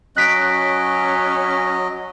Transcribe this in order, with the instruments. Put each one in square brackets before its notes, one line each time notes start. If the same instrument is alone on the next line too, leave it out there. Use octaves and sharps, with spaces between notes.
[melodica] F#3 D#5 [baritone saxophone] C#4 [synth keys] F#6 B6 D7